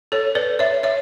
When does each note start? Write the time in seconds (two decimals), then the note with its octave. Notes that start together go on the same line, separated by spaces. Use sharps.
0.12 A4 C#5
0.35 B4 D5
0.59 C#5 E5
0.83 C#5 E5